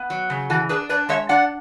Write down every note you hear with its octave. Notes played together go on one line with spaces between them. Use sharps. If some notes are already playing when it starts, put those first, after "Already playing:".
Already playing: B3
F#3
C#3
E3 F#4 A4
D4 G#4 B4
D4 B4 D5
G#3 C#5 E5
D4 D5 F#5